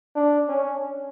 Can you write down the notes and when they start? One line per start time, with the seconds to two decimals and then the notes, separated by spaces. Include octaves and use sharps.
0.15 D4
0.48 C#4